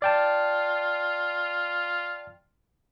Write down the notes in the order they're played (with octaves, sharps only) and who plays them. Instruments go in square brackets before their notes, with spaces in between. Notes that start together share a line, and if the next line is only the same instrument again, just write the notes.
[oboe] F4 [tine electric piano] D5 G5 A5